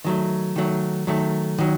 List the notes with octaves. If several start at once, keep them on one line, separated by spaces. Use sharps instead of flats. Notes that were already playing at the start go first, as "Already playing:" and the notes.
D#3 F#3 A3
D#3 F#3 A3
D#3 F#3 A3
D#3 F#3